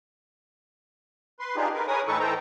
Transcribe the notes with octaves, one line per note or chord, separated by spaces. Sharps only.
B4 C6
D4 D#4 F4 G4 G#4
A#4 B4
G#4 A#4 B4 C#5 G#5 D#6
A2 E3 D#4 A4 B4 C#6
E3 A4 C5 G5 A#5